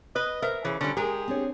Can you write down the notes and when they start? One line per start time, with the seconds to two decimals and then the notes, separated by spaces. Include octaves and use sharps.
0.16 B4 D#5
0.42 A#4 C5 E5
0.65 C#3 E3
0.81 D3 G3 C#4
0.97 G#3 G4 G#4 A#4
1.28 C4 D4 C#5